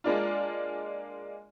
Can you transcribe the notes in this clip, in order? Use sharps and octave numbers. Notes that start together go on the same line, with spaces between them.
G#3 A#3 D4 F4